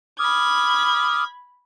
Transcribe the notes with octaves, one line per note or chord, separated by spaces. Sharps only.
B5 D6 D#6 F6 G#6